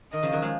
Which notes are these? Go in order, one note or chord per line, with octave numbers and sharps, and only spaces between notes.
D#3 D#5
C#3 F3
D#3 F#3
F3 G#3